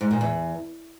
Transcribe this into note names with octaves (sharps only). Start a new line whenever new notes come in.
G#2
A#2
E2